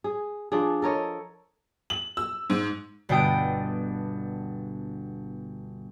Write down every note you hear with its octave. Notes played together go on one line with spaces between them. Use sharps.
G#4
F3 D4 G#4
A4 A#4 C#5 D#5
F#7
E6
G#2
G1 B2 D4 G5 D#6 D7